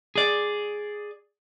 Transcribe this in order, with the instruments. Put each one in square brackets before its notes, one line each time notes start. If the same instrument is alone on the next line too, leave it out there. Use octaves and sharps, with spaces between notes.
[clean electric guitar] G#4 D5